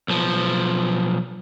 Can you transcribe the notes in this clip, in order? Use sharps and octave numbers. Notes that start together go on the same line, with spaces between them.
B1 F3